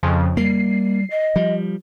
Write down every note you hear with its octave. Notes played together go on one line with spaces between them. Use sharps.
F2 C#3 F3
G3 A#3 C7
D#5
F3 G3